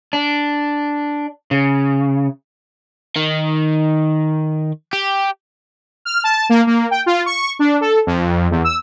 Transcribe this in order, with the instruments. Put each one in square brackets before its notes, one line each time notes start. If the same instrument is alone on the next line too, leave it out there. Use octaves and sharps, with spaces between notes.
[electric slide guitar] D4
C#3
[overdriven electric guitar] D#3
G4
[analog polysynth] F6
A5
A#3
A#3
G5
F4
C#6
D4
A4
F2
E2
E6